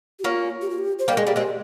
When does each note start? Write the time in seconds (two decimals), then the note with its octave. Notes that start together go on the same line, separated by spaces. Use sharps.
0.19 G4
0.23 A#3 C#4 F4
0.61 G4
0.70 F4
0.78 G4
0.99 C5
1.08 G3 A#3
1.11 A#4
1.17 G#3
1.23 G3 A#3 G#4
1.36 G#3 C4 G4